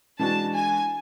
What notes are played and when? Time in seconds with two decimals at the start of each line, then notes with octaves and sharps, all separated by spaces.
0.19 E3 G#3 D4 F#4 A5
0.55 G#5